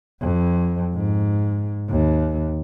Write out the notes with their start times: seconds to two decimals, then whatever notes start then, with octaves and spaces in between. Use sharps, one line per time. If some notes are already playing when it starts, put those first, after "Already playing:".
0.21 F2
0.95 G#2
1.90 D#2